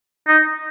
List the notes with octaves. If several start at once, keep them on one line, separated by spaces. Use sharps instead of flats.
D#4